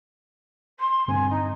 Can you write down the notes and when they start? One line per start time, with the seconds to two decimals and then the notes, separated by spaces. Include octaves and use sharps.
0.79 C6
1.08 G2 D3 C4 G#5
1.29 D#4